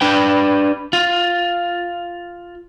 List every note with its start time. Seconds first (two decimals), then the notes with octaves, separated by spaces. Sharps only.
0.01 D4 B4 G5
0.93 F4